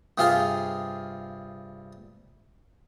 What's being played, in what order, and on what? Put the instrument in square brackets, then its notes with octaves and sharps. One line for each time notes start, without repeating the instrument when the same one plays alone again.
[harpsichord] G2 C3 F4 G#4 F5 C6